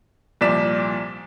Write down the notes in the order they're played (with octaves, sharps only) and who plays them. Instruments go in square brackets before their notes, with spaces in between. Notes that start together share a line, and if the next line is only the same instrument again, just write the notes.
[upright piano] C2 A#2 F3 D5 B6 E7